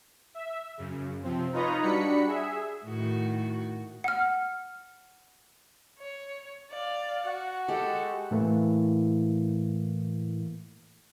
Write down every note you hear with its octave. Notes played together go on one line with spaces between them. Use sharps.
E5
F#2 C#3
C3 F3 C4
D#4 F4 B4 C#5 D#5 A#5
G3 D4 F#4 B5 B6 C#7
G#4 E5
A2 D#3 F#4
F#5 F6
C#5
D5 F5
F#4 F#5
G#3 G4 A4 F#5
A2 E3 A3 A#3